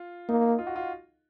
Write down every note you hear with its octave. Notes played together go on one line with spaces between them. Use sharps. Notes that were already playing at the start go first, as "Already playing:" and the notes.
Already playing: F4
A#3 D#4
F4
F#4
F4